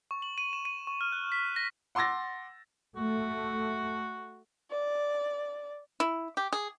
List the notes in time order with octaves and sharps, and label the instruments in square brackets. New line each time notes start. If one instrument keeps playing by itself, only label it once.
[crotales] C#6
F#7
D#7
E7
D#7
C#6
F6
F#6
B6
A#6
[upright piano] F#5 C6 D6 E6 A6 A#6
[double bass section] A3 [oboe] F#4
[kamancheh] D5
[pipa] E4
G4
G#4